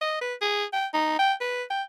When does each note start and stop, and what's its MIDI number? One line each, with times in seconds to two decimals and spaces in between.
0.01 0.18 75
0.21 0.34 71
0.42 0.65 68
0.73 0.87 79
0.94 1.15 63
1.19 1.33 79
1.41 1.64 71
1.70 1.83 79